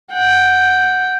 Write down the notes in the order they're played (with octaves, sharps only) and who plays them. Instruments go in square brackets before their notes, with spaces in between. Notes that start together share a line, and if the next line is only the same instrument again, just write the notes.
[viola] F#5 G5